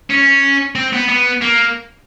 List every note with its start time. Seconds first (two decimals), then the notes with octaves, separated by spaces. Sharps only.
0.11 C#4
0.76 C4
0.93 B3
1.09 B3
1.42 A#3